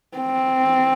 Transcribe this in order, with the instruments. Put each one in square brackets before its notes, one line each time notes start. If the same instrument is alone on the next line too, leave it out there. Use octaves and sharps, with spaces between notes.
[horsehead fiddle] C4